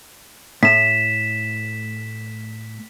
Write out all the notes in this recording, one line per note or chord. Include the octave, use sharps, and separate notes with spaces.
A2 B6 E7